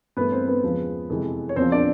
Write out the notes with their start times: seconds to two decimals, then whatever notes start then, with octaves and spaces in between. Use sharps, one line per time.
0.17 G2 E3 A3 B3 B4
0.32 C4 C5
0.48 B3 B4
0.63 E2 C#3 F3 G#3
1.10 F2 C3 E3 G#3
1.49 C#5
1.56 E2 C#3 F3 C4 C5
1.72 D4 D5